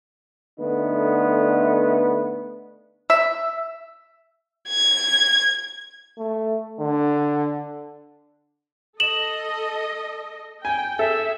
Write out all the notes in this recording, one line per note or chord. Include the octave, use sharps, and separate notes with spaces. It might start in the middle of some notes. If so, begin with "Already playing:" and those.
D3 A3 B3 D#4
E5
G#6
A3
D3
A4 D#5 E7 F#7
G5 G#5
G#4 A4 E5